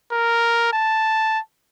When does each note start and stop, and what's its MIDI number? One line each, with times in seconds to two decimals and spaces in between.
0.12 0.71 70
0.73 1.39 81